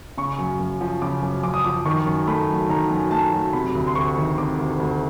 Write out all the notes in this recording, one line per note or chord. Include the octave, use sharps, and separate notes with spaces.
C#3 C#6
F#2
F#2
F3
C#3 D6
F#2
F#2 D6
D#6
F3 D6
D#3 C#6
F#2
A3 B5
F#3
D#3 A#5
F#2
A3 A5
F#3
C3 B5
D2
C6
D2 C#6
D#3
C3 D6
D2
D2